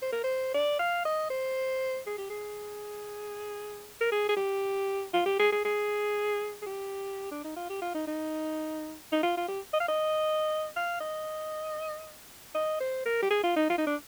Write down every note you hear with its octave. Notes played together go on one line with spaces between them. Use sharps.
C5
A#4
C5
D5
F5
D#5
C5
G#4
G4
G#4
A#4
G#4
G#4
G4
F4
G4
G#4
G#4
G#4
G#4
G4
D4
D#4
F4
G4
F4
D#4
D#4
D#4
F4
F4
G4
D#5
F5
D#5
F5
D#5
D#5
C5
A#4
G4
G#4
F4
D#4
F4
D#4
D4